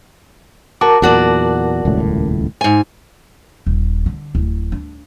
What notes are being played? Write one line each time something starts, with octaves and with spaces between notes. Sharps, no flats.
F#4 A#4 A5 D6
E2 A#2 F#3 F#4 D5
D#1 C#2 A2
G#2 G#5
D#1
D3
D1
D4